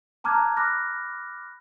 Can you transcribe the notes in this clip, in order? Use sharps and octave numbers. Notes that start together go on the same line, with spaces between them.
A5 A#5 D6 F6 F#6 G#6
B5 D6 F6 F#6 A#6